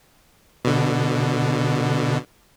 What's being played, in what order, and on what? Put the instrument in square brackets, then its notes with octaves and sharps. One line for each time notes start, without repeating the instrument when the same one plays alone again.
[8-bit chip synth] B2 D3